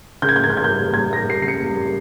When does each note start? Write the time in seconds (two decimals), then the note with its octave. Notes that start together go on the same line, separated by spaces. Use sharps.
0.22 C#3 G6
0.29 G#6
0.36 G6
0.44 G#6
0.47 C#3 G6
0.57 G#6
0.64 G6
0.70 G3
0.94 G3 G#6
1.13 A#6
1.18 G3
1.30 C7
1.42 C#3 C7
1.48 C#7
1.66 G3